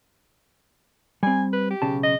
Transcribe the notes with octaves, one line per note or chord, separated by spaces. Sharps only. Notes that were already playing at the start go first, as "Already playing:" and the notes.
G3 C4 G#5
B4
G4
B1 C#3 A5
D#5